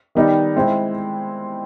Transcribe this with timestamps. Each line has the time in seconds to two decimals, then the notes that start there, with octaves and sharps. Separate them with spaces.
0.15 D#3 G3 B3 D#4
0.56 G#3 C4 E4